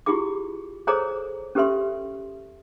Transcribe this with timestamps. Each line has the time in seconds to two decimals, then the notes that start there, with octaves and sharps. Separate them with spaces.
0.06 E4 F4 G4 G#4 D6
0.87 G#4 A4 C5 C#5 A#5 D6
1.55 C#4 G4 A4 B4 E5 C6